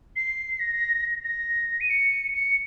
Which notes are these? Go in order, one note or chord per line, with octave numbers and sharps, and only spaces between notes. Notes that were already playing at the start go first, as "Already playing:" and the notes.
C7
A#6
A#6
D#7
C#7
C#7